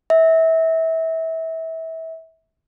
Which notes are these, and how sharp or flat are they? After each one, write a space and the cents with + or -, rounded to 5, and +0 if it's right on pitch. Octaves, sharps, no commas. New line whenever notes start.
E5 -25